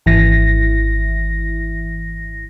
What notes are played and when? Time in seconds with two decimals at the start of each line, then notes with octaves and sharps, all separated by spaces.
0.06 G#1 E3 A#6